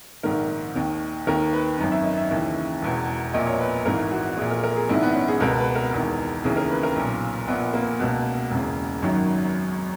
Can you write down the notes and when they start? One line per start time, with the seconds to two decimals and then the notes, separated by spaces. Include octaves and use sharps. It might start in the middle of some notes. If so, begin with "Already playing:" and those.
0.23 A#1 G#2 D#3 A#4
0.75 D#2 D#3
1.27 D#2 D#3 A#4
1.53 B4
1.78 G#1 F#2 D#3
1.92 E5
2.04 D#5
2.17 E5
2.31 D#2 C#3 E3
2.82 E1 E2 B2
3.34 A#1 A#2 D#5
3.47 C#5
3.59 B4
3.85 G#1 G#2 E3 A#4
4.11 F#4
4.37 A#1 A#2 G#4
4.51 A#4
4.64 A#4
4.76 G#4
4.89 A#1 G#2 D#3 E4
5.02 B3
5.14 C#4
5.28 G#4
5.40 C#2 B2 A#4
5.58 B4
5.75 A#4
5.93 E1 E2 D#3
6.44 D#2 C#3 E3 G#4
6.57 A#4
6.70 B4
6.83 A#4
6.96 B1 A#2
7.48 A#1 A#2 B3
7.74 A#3
7.99 C#2 B2
8.51 E1 E2 C#3
9.02 G#1 F#2 D#3 F#3